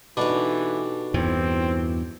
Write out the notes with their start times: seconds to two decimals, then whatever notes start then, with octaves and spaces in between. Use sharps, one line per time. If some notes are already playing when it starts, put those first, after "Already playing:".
0.17 B2 E3 D4 D#4 G4 A4
1.14 E2 G2 E3 C4